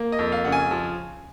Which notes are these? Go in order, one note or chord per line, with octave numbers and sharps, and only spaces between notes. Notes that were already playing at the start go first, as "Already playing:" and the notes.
Already playing: A#3
D#5
F2
F5
C#3 F#5
G#5
F3